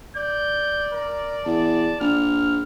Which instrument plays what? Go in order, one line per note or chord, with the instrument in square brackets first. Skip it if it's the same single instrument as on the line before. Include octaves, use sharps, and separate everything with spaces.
[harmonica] D5 [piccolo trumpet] G6
[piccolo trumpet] A#4
[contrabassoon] E2 [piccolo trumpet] A5
[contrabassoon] A#1 [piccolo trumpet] F6